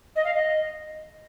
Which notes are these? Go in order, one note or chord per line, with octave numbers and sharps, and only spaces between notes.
D#5
F5
D#5